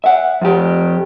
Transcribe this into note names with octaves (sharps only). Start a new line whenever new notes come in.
E5 F#5
F2 G4